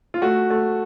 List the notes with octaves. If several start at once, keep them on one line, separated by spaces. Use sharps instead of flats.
F4
A3 F#4
A3